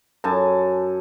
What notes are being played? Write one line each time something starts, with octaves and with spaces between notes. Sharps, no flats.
F#2 A4 G#5 A5